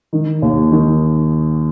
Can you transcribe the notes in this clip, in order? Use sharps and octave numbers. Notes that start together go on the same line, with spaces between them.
D#3
D#2
D#3